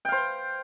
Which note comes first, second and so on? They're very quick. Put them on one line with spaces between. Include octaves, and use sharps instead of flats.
G5 F5 C5